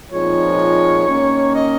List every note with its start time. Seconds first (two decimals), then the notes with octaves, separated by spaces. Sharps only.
0.11 A#2 F3 G#3 C4 D#4 C#5
1.06 D#3 A#3 C#4
1.55 D#5